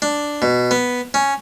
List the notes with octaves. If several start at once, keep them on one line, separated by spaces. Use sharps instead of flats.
D4
B2
B3
C#4